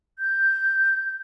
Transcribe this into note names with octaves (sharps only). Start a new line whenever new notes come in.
G6